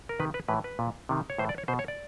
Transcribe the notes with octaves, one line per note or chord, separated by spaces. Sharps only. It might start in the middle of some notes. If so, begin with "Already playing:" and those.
A#4
C3 D#3 B4
B4
A2 E3 B4
B4
A#2
C3 D#3
C#5
A2 E3 C5
D5
C#5
B2 C5
C#5
D5